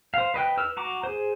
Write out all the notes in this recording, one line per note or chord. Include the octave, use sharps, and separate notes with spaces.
C5 F5
B4 D#5 G5 F#6
B4 E6 F6
F#4 A#5 D6
G#4 C5